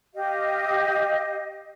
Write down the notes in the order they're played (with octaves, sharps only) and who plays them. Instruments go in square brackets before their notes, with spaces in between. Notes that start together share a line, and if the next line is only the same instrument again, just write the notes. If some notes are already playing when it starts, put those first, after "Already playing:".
[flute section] G4 D#5 F5